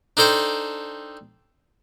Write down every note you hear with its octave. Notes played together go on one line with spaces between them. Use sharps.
D4 D#4 A4 C5 G5